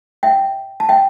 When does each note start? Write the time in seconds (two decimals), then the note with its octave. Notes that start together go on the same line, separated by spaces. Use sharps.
0.23 E5 G5
0.80 A5
0.89 E5 G5